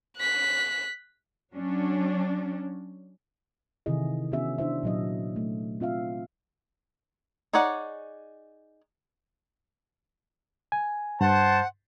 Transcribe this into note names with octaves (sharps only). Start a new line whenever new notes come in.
F#6 B6
F#3 C#4 D4
C3 D#3 E3 E4 G#4 D#5
B3 C#4 D4 F#4 G#4 E5
D4 E4 C5 E5
A#2 F#3 D#5
A3
C4 F4 E5 F5
D#4 G#4 C#5 D5 F#5
G#5
G2 C5 F#5 A5